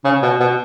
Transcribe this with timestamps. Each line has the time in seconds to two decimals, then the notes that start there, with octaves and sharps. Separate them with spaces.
0.04 C#3
0.22 B2
0.40 B2